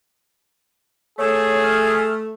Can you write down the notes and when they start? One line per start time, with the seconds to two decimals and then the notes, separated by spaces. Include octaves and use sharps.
1.18 A3 G#4 C#5
1.64 F6